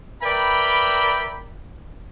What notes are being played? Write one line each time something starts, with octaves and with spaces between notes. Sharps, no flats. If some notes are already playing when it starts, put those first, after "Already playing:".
A#4 B4 D5 E5 G5 B5